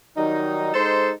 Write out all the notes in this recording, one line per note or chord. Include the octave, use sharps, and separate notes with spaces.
D#3 F#3 G3 D#4
G#3 D#4 A4 C5